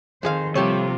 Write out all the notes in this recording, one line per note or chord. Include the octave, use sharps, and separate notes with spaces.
F2 D#3 G#4 C5 F5
C3 F3 G3 A#3 F4 G4 A4 C#5